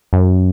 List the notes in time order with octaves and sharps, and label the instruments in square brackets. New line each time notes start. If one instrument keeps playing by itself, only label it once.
[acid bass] F#2